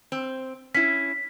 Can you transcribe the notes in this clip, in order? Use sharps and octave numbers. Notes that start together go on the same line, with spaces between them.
C4
C#4 E4 B6